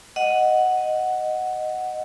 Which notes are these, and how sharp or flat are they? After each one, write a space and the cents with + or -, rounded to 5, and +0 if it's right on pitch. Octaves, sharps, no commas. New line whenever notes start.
D#5 +0 F#5 +0